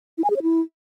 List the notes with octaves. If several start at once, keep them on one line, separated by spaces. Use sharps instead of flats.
E4
G#5
G#4
C#5
E4